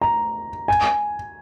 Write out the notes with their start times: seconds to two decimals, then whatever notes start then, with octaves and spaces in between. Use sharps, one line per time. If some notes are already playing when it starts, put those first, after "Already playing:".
0.01 A#5
0.68 G#5